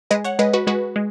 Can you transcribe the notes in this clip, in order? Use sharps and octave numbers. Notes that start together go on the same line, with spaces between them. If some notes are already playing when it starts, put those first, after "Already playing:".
G#3 B4 D#5
C#5 F#5
G#3 B4 D#5
F#4 B4
G#3 F#4 B4
G#3